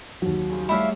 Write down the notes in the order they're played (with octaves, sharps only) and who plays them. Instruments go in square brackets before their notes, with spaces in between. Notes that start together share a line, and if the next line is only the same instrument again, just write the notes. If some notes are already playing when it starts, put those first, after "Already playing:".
[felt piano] D#2 F#3
[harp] C#3 F3
[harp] G3 A3 C#5 [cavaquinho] E4 E5 F5